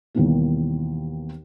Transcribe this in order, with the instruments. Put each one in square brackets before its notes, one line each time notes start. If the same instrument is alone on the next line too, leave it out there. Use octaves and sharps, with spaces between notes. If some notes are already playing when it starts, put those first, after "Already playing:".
[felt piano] D#2 B2 D#3 E3 G3 A#3